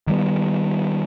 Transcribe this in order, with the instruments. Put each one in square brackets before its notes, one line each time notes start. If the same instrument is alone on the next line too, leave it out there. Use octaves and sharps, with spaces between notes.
[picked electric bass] D#3 G3 B3